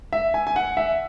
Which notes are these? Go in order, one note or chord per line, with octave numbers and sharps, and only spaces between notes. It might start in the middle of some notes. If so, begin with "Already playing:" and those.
E5
G#5
G#5
F#5
E5